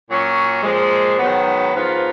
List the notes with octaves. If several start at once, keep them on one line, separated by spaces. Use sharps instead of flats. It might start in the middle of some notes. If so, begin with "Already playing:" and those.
A#2 F#3 C#4
A#2 F3 G#3
G#2 D#3 F#3 B3
G#2 F3 B3 F4 A#4